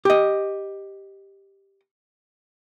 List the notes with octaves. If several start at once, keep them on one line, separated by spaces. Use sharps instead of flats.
G4 D#5